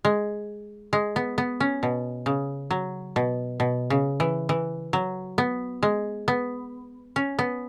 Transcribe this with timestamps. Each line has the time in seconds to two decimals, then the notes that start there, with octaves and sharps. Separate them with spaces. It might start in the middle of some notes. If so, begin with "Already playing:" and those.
0.05 G#3
0.93 G#3
1.16 B3
1.38 B3
1.60 C#4
1.83 B2
2.26 C#3
2.71 F#3
3.16 B2
3.60 B2
3.90 C#3
4.20 E3
4.49 E3
4.93 F#3
5.38 B3
5.83 G#3
6.28 B3
7.16 C#4
7.39 B3